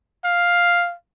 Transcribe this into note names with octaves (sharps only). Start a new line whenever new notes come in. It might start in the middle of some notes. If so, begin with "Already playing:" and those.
F5